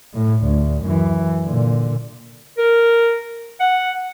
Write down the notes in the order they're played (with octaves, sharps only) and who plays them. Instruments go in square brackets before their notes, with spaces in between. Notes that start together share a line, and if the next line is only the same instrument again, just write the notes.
[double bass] A2
D2
F#2 E3
A#2 D3
[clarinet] A#4
F#5